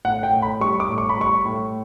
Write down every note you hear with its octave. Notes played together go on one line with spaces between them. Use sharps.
A2 F#5
G5
A2
B5
G3 C#6
D6
A2
C#6
B5
G3 C#6
A2